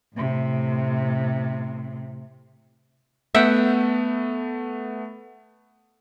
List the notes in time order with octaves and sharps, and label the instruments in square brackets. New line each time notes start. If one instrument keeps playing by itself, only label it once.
[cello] A2 C3
[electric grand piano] A3 B3 [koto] E5 F#5 G5